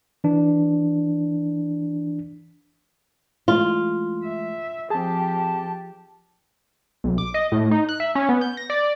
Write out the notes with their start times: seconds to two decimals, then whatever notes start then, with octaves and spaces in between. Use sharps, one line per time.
0.24 E3 D4
3.48 E3 G#3 A3 F4
4.24 E5
4.90 F3 C4 G4 G#4 A5
7.04 B1
7.18 D6
7.34 D#5
7.52 A2
7.71 D#4
7.89 F#6
8.00 E5
8.15 C#4
8.29 B3
8.41 G6
8.57 A#6
8.70 D5